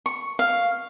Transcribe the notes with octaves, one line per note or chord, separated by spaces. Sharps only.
C#6
F5